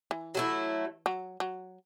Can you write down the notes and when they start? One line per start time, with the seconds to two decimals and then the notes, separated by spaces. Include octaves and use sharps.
0.11 E3
0.35 F#3 A3 E4
1.06 F#3
1.40 F#3